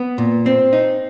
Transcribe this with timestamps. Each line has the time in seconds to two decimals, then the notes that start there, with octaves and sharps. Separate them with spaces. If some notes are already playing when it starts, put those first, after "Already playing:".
Already playing: B3
0.18 A#2
0.46 C4
0.73 D#4